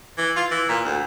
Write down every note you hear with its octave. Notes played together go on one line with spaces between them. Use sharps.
E3
F4
E3
A#2
D2